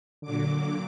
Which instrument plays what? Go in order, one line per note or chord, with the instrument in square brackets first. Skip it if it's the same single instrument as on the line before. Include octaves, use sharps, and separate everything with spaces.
[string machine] A#2 F#3 D6 [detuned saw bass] D3